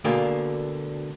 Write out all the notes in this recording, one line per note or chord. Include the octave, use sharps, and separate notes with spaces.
D2 B2 D3 A#3 G#4 G5